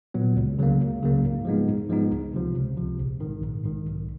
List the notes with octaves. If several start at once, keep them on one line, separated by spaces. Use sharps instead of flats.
A#2 F#3 B3
C#2
C#3 F#3 A#3
C#2
C#3 F#3 A#3
G#2
F3 G#3 B3 D#4
G#2
F3 G#3 B3 D#4
C#2
C3 F3
C#2
C3 F3
A#1
G#2 D#3
A#1
G#2 D#3
B1